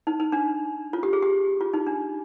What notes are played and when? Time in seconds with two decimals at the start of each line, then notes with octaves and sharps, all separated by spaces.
0.07 D#4
0.20 D#4
0.32 D4
0.93 F4
1.03 G4
1.13 G#4
1.22 G4
1.61 F4
1.73 D#4
1.87 D4